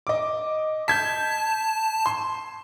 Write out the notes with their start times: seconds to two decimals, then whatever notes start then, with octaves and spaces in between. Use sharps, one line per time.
0.07 D#5 D6
0.88 A5 G6 G#6 B6
2.06 C6